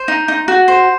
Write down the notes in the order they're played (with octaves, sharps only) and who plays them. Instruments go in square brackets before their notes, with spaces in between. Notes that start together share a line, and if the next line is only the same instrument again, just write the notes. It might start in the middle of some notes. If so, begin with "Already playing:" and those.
Already playing: [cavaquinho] C5
D#4
D#4
F#4
C5